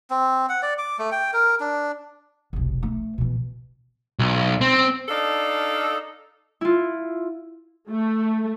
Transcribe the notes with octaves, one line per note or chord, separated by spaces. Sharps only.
C4
F#5
D5
D6
A3
G5
A#4
D4
F1 B1
A3
B2 E3
B1
C4
D4 D#4 A4 D5 F5
E4 F4
A3